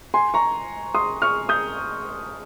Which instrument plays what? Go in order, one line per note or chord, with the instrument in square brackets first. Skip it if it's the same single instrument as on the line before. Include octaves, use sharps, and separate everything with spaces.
[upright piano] G#5 C6
A#5 C#6
C6 D#6
C#6 F6
D#6 G6